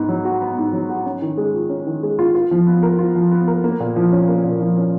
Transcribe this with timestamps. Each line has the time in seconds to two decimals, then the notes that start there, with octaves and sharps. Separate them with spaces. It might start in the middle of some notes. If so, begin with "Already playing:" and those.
Already playing: G#2 B3
0.09 F#3
0.25 F#4
0.42 B3
0.57 G#2
0.73 F#3
0.89 F#4
1.05 C#4
1.22 D#3
1.37 G#3
1.54 F4
1.69 C#4
1.87 D#3
2.03 G#3
2.19 F4
2.35 F4
2.51 F3
2.67 B3
2.83 A#4
2.99 F4
3.16 F3
3.31 B3
3.48 A#4
3.64 A#3
3.80 A#2
3.96 F3
4.12 C#4
4.28 A#3
4.44 A#2
4.60 F3
4.77 C#4